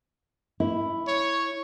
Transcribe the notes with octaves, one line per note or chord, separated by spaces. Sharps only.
E4
C#5